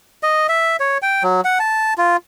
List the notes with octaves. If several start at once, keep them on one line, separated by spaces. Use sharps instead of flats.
D#5
E5
C#5
G5
F#3
F#5
A5
F4